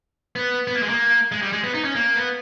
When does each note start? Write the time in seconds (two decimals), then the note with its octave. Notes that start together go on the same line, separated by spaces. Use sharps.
0.36 B3
0.67 B3
0.75 A#3
0.82 G#3
0.89 A#3
1.32 G#3
1.42 G3
1.53 G#3
1.64 B3
1.74 D#4
1.85 C#4
1.95 A#3
2.16 B3